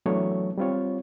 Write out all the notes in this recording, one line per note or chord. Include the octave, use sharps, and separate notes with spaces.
E3 F#3 A3 B3 D4 C#5
G3 C4 F4 C#5